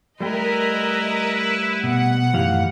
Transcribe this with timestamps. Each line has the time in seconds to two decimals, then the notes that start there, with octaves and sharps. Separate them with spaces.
0.21 G3 A3 E4 A#4 B4 D#5 G5
1.84 B2 F#5
2.34 F#2 A2 D#3 E3 G4 F5